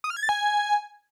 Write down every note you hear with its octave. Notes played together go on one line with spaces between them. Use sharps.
D#6
F6
G#6
A6
G#5